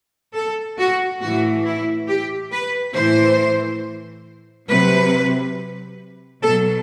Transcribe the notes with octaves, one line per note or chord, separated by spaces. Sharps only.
A4
F#4
A2 E3 F#4
E4
G4
B4
A2 E3 C5
C3 F#3 B4
B2 F#3 A4